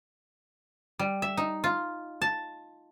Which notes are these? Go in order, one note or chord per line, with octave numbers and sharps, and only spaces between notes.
G3
E5
D#4
F4
A5